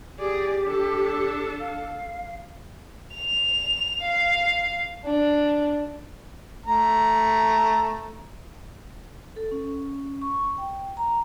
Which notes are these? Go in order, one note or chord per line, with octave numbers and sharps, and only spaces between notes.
G4 G#4 D5
D4 A4
F5
F7
F5
D4
A3 A#5
A4
C#4
C#6
G5
A#5